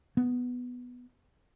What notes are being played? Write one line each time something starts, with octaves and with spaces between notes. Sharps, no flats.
B3